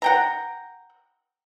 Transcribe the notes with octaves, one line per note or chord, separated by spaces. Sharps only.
F#5 G5 A#5